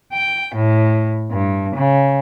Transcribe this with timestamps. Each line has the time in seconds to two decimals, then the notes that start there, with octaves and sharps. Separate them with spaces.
0.14 G5
0.57 A2
1.32 G2
1.76 C#3